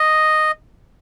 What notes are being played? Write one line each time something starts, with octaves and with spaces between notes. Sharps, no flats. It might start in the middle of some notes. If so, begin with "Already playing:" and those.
Already playing: D#5